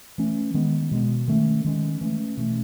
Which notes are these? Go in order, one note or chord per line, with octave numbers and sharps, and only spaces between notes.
E3 A3 C#4
D#3 G#3 B3
B2 G#3 B3
D#3 A3 C#4
D#3 G#3 C#4
E3 A3 C#4
B2 A3 C#4